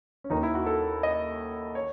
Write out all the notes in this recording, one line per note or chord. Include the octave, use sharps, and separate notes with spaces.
C#4
D#2 D#3 D#4
E4
F#4
A4
D#5
C#5